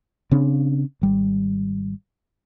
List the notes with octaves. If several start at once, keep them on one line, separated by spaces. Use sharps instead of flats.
C#3 C4 D4
G#1 G3